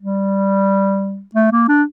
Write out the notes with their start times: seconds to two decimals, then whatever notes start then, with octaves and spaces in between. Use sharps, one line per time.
0.01 G3
1.35 A3
1.52 A#3
1.68 D4